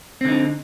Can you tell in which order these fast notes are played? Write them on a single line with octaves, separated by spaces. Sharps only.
C4 D3 D#4